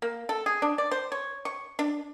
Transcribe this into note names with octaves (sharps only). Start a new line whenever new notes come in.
A#3
A4
G#4
D4
D5
C5
C#5
C#6
D4